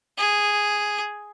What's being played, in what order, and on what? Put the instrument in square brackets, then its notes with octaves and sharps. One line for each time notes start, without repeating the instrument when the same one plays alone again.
[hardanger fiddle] G#4